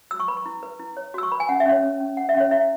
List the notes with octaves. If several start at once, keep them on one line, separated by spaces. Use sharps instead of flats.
F#4 E6
C#6
B4 B5
C#6
E4
B4
E4
C#5
F#4 E6
C#6
B4 B5
G#5
C#4 F#5
E5
C#4
C#5
C#4
C#4
C#4 F#5
E5
C#4
C#5
E4 E5